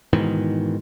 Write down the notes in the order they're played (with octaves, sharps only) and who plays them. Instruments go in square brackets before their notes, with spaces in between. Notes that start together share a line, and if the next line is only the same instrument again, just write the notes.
[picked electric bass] G#2 B2 D#3 E3